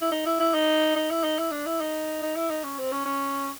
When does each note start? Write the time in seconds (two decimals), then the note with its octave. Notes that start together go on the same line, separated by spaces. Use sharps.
0.01 E4
0.12 D#4
0.26 E4
0.40 E4
0.54 D#4
0.96 D#4
1.10 E4
1.23 D#4
1.38 E4
1.51 D4
1.66 E4
1.80 D#4
2.22 D#4
2.36 E4
2.50 D#4
2.64 C#4
2.78 C4
2.92 C#4
3.05 C#4